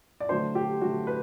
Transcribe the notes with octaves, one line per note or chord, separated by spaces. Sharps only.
D5
D3 F#3 A3 C5
G4
D3 F#3 A3 F#4
B4